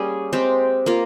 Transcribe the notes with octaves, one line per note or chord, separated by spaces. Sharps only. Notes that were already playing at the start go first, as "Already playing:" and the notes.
Already playing: G3 A#3 C#4 G#4
G#3 C4 G4
A#3 F4 A#4